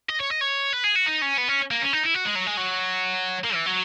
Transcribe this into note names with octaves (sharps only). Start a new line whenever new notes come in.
D#5
C#5
D#5
C#5
B4
G#4
F#4
D#4
C#4
B3
C#4
A#3
C#4
D#4
E4
F#4
G#3
F#3
G#3
F#3
A#3
E3
F#3